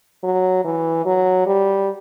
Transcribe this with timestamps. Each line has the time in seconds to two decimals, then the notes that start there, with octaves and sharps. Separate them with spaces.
0.24 F#3
0.65 E3
1.05 F#3
1.46 G3